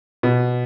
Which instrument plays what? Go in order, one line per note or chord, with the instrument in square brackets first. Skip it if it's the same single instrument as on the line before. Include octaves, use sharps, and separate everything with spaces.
[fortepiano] B2